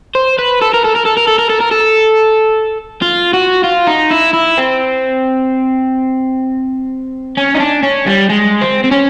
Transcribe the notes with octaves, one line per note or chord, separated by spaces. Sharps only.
C5
B4
A4
A#4
A4
A#4
A4
A#4
A4
A#4
A4
A#4
A4
F4
F#4
F4
D#4
E4
E4
C4
C#4
D#4
D4
C#4
G3
G#3
C4
C4
C#4